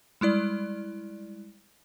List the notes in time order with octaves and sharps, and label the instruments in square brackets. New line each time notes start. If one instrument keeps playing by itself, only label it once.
[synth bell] G3 G#3 E4 D5